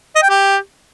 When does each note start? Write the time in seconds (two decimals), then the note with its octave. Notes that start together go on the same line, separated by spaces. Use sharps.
0.16 D#5
0.23 G5
0.30 G4